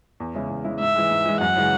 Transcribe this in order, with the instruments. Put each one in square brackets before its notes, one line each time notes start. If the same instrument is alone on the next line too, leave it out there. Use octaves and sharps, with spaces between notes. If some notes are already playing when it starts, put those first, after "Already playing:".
[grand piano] E2
C#3 G#3 E4
E2
C#3 G#3 E4
[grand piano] G#2 [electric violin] E5
[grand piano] E3 G#3
G#2
E3 G#3
[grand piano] F#2 [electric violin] F#5
[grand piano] C#3 E3 G#3 C#4